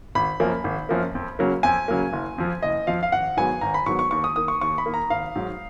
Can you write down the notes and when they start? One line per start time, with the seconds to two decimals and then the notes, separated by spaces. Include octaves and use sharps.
0.15 G#1 B5
0.40 F#2 F3 A#3
0.64 G#1
0.89 F#2 F3 A#3
1.15 F2
1.39 C#3 F#3 A#3
1.63 F2 G#5
1.88 C#3 F#3 A#3
2.13 F#1
2.38 F2 F3
2.62 F#1 D#5
2.87 F2 F3 F5
3.03 F5
3.12 G#1 F#5
3.37 G#2 D#3 F#3 B3 G#5
3.61 G#1 A#5
3.74 B5
3.86 G#2 D#3 F#3 B3 C#6
3.99 C#6
4.11 D#2 C#6
4.24 D#6
4.36 D#3 A#3 D#6
4.48 C#6
4.61 D#2 C#6
4.78 B5
4.86 D#3 A#3
4.94 A#5
5.10 G#1 F5
5.36 G#2 F#3